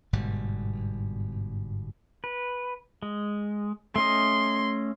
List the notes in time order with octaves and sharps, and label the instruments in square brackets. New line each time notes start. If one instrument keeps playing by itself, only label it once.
[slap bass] G1 G#2 B2 G3
[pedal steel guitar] B4
G#3
[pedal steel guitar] A3 C#4 D#5 [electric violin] C6